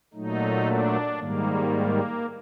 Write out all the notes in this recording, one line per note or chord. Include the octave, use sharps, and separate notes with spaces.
A#2 F#3 A3 D#4
D4
G#2 D#3 G3 A#3